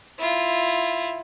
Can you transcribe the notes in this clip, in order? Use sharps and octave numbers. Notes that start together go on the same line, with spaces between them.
E4 F4